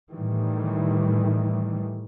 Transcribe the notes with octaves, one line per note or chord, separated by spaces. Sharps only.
A2 D#3 E3 G3